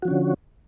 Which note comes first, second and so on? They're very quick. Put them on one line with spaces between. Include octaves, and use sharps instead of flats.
F#4 F3 C#4 D3